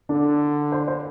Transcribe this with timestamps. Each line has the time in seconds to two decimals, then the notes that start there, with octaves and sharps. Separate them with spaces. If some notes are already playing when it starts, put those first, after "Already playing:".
0.09 D3 D4
0.72 C5
0.88 C5